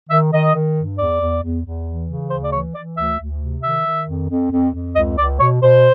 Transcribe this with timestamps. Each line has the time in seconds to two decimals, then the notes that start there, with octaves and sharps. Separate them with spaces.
0.10 D#3 E5
0.32 D#3 D#5
0.55 D#3
0.76 G2
0.98 E2 D5
1.20 E2
1.43 E2
1.65 E2
1.87 E3
2.09 C#3
2.30 D2 C5
2.44 D5
2.53 E3 C#5
2.75 E3 D5
2.97 D2 E5
3.19 D2
3.41 C3
3.63 D#3 E5
3.85 D#3
4.07 F2
4.29 F2
4.51 F2
4.73 F2
4.95 C#2 D#5
5.18 C#2 D5
5.40 B2 C#5
5.61 B2 C5